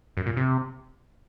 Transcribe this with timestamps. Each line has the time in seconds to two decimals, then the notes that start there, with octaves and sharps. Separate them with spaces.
0.17 F#2
0.26 A#2
0.37 C3